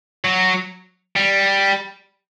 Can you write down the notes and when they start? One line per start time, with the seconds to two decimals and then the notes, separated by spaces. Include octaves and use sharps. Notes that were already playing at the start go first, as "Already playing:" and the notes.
0.25 F#3
1.16 G3